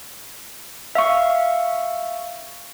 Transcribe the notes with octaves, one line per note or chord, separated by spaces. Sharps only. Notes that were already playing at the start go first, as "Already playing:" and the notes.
E5 F5 C#6